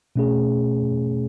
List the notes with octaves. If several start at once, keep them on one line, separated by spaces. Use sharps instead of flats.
B2 A3 C#4 G#4